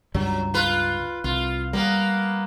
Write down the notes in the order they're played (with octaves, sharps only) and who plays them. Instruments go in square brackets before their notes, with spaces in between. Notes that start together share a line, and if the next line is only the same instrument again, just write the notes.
[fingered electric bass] C#2 G2 G3 [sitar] F#3
[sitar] F4 B4
[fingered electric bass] C2 [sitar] F4
[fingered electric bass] G3 [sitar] A#3 B3